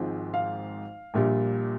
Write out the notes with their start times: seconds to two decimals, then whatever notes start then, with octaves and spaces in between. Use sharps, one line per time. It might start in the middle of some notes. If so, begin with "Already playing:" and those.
Already playing: G#1 G#2 F3 G#3 C4
0.34 F5
1.14 A#1 A#2 G3